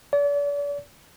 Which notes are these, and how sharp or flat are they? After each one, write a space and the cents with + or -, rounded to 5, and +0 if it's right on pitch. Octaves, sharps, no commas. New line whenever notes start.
D5 -40